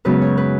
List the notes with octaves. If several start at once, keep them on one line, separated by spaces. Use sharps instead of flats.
F#2 C#3 G#3 B3 B4
C#5
B4